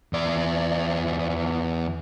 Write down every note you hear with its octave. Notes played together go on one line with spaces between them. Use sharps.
E2 D5